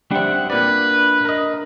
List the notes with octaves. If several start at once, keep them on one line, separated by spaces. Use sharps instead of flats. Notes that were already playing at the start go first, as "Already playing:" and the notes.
G3 C4 D4 E5 F#5
A#2 B4 D5
A#4 D#5